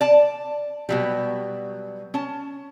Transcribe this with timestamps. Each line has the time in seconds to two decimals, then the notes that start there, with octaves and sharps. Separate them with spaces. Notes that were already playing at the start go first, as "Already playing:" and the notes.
0.01 D5 A5
0.89 B2 F#3 G3
2.14 C#4 A5